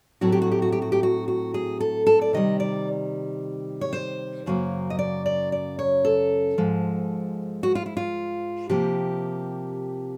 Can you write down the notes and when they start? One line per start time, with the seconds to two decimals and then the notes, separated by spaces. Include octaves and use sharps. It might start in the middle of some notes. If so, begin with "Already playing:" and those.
0.21 A2 F#3 A3 C4 F#4
0.32 G4
0.42 F#4
0.52 G4
0.62 F#4
0.72 G4
0.82 F#4
0.92 G4
1.03 F#4
1.28 F#4
1.54 G#4
1.80 A4
2.07 A4
2.21 D5
2.33 C3 D#3 G3 D#5
2.60 D5
3.81 C#5
3.93 C5
4.46 F#2 C#3 F#3 A#3
4.90 D#5
4.99 D5
5.26 D5
5.52 D5
5.79 C#5
6.05 A4
6.58 G#2 F3 G#3
7.63 F#4
7.75 F4
7.86 E4
7.97 F4
8.69 C3 F3 A#3 G4